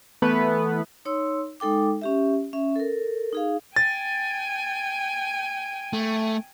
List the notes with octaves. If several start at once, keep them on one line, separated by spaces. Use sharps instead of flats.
E3 A3 B3 B4
D#4 C#5 C6 E6
G#3 D#4 A4 G5 D6
C#4 G4 E5
C#4 E5
A4 A#4
D#4 G#4 F5
G5 G#5 A6
A3